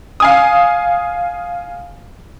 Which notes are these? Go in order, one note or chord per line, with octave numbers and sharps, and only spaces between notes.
F5 G#5 D#6